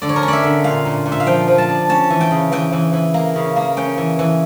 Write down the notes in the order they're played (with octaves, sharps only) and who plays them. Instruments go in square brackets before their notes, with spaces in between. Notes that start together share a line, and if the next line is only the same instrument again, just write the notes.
[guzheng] D3 D5
C#5
A#4
C#4 C#5
D5 E5
D3
A#2 F5
A#2
A#2
E5
F5
F3 G5
F3
A5
D4
C#4 A5
E3
G5
C#3
E3 G5
E3
E3
A#3
C#3
A#3
C#4 G5
E3
E3